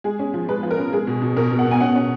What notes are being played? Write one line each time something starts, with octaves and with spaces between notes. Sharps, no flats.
G#3 G#4
C#4
F3
G#3 B4
F3
A#4
C#4
G#3 G#4
B2
B2
B2 A#4
B2
F#5
B2
G#5
C#4 F#5
C#4